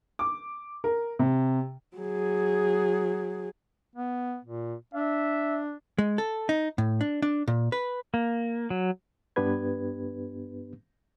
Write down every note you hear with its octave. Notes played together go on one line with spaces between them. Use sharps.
D6
A#4
C3
F#3 G#4
B3
A#2
D4 E5
G#3
A4
D#4
A2
D4
D4
A#2
B4
A#3
F#3
G2 B3 D4 G4 B4 G#6